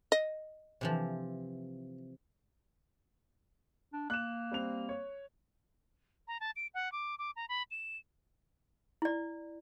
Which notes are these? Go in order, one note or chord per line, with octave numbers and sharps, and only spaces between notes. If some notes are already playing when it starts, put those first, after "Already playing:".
D#5
C3 E3 F3
D4
A#3 F#6 E7
G3 C4 F7
C#5
A#5
A5
D7
F#5
D6
D6
A#5
B5
E7
E4 D5